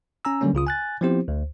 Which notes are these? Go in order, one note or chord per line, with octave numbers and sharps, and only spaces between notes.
C#4 G#5 A#5 E6
D3 F#3 G3 A#3 C#4
C#2 C#3 F4 D#6
G#5 F#6 A6
F3 B3 C4 E4 G4 C5
D2